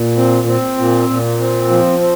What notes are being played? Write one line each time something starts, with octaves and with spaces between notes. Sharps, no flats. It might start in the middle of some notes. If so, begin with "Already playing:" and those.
Already playing: A#2
C4
C4
A#2
A#2
C4
F3
C4